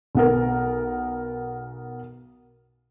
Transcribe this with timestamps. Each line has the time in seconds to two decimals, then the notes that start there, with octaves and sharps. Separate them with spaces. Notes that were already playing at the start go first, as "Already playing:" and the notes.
0.15 B1 B3 A#4